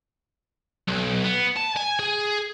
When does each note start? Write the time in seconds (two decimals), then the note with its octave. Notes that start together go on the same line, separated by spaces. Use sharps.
0.88 B1
1.24 B3
1.56 A5
1.76 G#5
1.99 G#4